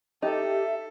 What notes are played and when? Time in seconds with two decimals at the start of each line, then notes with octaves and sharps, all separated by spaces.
0.22 D#4 G4 A4 E5